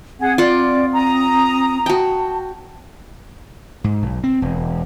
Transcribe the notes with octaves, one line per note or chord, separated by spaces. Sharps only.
C4 G#4 F#5
F4 D5 F#5
A#5 D#6
F#4 G5 A5
G#2
B1
C4
E1